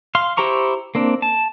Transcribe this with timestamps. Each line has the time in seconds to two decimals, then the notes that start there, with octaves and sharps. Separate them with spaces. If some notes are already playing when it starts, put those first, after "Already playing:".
0.15 F5 C6
0.37 E4 G4 C5 A#5 C#6
0.95 A#3 C4 D4
1.22 A5